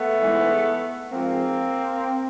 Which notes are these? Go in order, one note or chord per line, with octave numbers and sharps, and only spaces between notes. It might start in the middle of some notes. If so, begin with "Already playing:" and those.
Already playing: A3 B3
G#2 E3 G#3
G#2 F3 G#3 A#3 C4